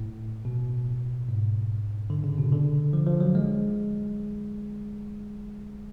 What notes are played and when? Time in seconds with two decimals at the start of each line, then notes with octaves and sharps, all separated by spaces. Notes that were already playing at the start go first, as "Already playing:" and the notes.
Already playing: A2
0.45 B2
1.29 G#2
2.10 D3
2.24 C#3
2.38 B2
2.52 D3
2.93 F3
3.07 F3
3.20 F#3
3.35 G#3